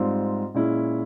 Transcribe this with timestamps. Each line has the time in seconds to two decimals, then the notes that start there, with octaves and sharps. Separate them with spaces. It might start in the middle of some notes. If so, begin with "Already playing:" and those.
Already playing: G#2 G3 C4 F4
0.54 A#2 G#3 C#4 E4